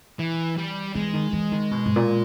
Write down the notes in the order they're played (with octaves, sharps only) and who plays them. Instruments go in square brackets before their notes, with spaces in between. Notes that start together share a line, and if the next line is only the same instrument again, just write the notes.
[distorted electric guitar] E3
G3
[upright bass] E3 [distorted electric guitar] G#3
[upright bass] D#3
E3
D#3
B2
G#2
A#2